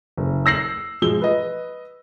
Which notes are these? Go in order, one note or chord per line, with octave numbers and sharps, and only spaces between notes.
F#1
E6 A#6 C7 F#7
F3 G#3 E6 G7
B4 D#5